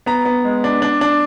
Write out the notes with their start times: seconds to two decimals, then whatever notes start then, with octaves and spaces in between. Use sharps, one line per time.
0.06 B3 A#5
0.25 B3
0.44 G#3
0.64 D4
0.82 D4
1.01 D4